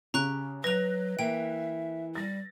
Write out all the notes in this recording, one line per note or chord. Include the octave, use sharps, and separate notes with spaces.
C#3 G4 A#5 C#6 F#6
F#3 B4 F#6 A#6 F7
E3 A#3 E5 G5
G3 A6 A#6